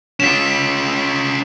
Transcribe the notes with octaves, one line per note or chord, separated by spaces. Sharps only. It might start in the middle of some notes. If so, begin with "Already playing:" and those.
C#4 F4 B6 E7